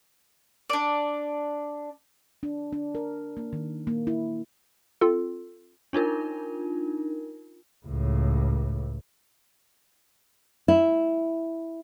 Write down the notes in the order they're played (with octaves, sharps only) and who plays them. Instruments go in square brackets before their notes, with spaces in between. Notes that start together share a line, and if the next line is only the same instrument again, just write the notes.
[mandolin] D4 D5
[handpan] D4
D4
A#4
A#3
D#3
A#3
E4
[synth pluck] C4 F4 A4
[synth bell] D4 D#4 F4 A#4
[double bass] C#2 A2
[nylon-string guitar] E4